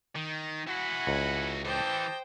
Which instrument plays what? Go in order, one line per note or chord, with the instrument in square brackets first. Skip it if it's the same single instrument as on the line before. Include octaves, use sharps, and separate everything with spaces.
[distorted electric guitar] D#3
[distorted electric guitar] E4 F#4 [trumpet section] F#5 G#5 B5
[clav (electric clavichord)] C#2
[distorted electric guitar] E3 A4 [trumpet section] G4 D#5 A5 [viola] C5 G5